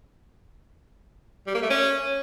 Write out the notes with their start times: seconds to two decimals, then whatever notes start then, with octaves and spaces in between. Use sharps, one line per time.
1.47 G3
1.55 A#3
1.62 A3
1.70 C#4